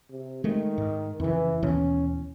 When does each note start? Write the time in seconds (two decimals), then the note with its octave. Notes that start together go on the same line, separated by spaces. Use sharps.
0.10 C3
0.44 D#3 G#3 A3
0.78 G#2
1.20 F2 C#3 E3
1.63 D#2 B2 E3 C#4